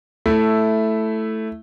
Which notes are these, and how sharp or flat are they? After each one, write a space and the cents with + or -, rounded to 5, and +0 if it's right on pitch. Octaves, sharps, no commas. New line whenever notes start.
A3 +0 E4 +0